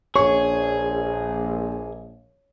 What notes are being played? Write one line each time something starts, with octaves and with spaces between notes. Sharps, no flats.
A#1 G#4 C#5 C#6